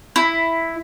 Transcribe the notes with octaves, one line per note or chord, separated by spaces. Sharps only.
E4